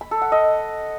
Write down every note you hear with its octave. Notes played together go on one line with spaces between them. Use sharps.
B5
A4
F#5
D#5